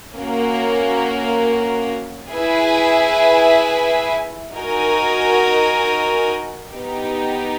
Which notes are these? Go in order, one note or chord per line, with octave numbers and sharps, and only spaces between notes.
A#3 C#4 F#4 A#4
E4 G#4 B4 E5 G#5
D#4 F#4 A#4 D#5 G#5
B3 D#4 G4